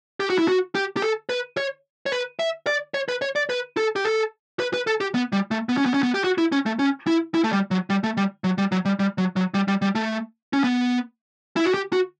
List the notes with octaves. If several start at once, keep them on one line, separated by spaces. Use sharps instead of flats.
G4
F#4
E4
F#4
G4
G4
A4
B4
C#5
C#5
B4
E5
D5
C#5
B4
C#5
D5
B4
A4
G4
A4
B4
B4
A4
G4
B3
G3
A3
B3
C#4
B3
C#4
B3
G4
F#4
E4
C#4
A3
C#4
E4
E4
A3
G3
F#3
G3
A3
G3
F#3
G3
F#3
G3
G3
F#3
F#3
G3
G3
G3
A3
C#4
B3
E4
F#4
G4
F#4